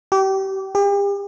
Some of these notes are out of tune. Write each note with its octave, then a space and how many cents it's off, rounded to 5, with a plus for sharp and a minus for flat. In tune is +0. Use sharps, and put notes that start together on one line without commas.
G4 -30
G4 +40